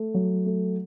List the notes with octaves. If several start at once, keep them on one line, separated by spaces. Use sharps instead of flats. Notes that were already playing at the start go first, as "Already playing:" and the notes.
Already playing: A3
F#3
A3